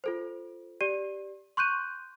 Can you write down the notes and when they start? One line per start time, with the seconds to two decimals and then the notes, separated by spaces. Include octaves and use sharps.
0.04 F4 A4 C5
0.81 G4 D5 D#7
1.57 C6 C#6 F#6 G6 D#7